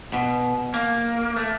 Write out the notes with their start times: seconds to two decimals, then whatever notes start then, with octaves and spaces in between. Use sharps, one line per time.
0.13 B2
0.74 A#3
1.37 A3